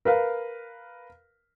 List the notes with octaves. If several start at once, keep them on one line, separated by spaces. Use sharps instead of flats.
A#4 B4 F5